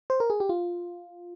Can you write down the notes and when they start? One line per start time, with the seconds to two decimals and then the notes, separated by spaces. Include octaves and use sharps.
0.10 C5
0.20 A#4
0.30 G#4
0.40 G4
0.49 F4